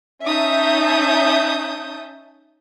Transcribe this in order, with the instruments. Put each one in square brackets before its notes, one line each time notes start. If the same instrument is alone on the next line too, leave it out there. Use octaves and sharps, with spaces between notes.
[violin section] C#4 D#4 E5 A5 D#6 G6